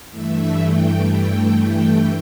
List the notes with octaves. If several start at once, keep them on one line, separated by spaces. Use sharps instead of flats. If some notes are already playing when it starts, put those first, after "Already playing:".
G2 E3 A3 E5
G5
G5
G5